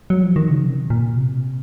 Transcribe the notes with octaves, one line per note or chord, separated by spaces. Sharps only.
F#3
F3
D#3
C#3
C3
A#2
C3